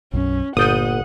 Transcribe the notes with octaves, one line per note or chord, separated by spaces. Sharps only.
B1 F#2 C#4
G1 A#2 D5 F#5 D#6 G6 D#7